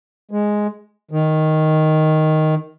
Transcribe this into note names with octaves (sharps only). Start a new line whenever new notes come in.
G#3
D#3